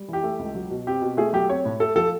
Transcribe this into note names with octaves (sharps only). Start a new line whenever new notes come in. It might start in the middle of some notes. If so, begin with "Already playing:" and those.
Already playing: G3
E3 G4
A3
C#2
F#3
B2
C4 G4
B2
A3 G#4
F#3 G4
C4 C#5
A2
A3 A4
F3 A4